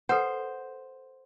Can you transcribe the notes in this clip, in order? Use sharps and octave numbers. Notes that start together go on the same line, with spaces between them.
A4 B4 C5 F#5